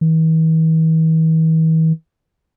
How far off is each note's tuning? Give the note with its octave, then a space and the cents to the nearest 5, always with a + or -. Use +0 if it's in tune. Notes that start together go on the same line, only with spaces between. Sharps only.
E3 -45